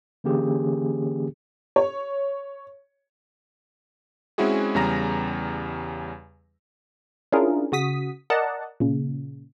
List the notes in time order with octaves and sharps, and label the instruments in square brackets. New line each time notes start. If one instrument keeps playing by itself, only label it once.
[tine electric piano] D3 E3 A#3 C#4 G4 G#4
[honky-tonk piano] C#5
[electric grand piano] G#3 C4 C#4 E4 F#4 G#4
E2 C#3 G3 A#5 A#6
[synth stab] C#4 D4 E4 F4 G#4 A#4
C#3 F#4 D#6 B6
A#4 D5 D#5 F#5 A5
A#2 C#3